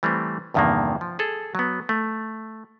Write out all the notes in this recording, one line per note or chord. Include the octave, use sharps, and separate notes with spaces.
E3 G3 A3 C4
E2 G2 C3 D#3 F3 A#3
F3
G#4 A4
F#3 B3
A3